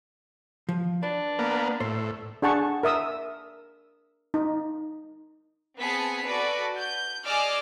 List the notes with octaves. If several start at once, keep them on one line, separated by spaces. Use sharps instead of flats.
F3
D4 B4
A#3 B3
A2 C5
D4 G#4 F#5 A5 C#6
A#4 E5 D#6 E6
D#4
B3 C4 G#4 A5 B6 C#7
F#4 A4 B4 D5
G6
G#4 D5 D#5 D6 E6 F6